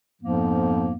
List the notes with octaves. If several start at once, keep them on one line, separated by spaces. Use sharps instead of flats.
F2 G#2 F3 A#3 B3